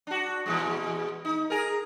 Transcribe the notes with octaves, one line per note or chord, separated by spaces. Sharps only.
D4 F#4
A#2 E3 G#3
D#4
G#4 A#4